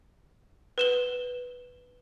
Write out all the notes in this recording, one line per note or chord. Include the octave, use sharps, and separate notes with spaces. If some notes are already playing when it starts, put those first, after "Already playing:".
B4 E7 G7